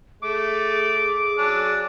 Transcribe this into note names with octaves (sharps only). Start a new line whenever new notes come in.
A3 G#4 D6
F#3 C#4 D4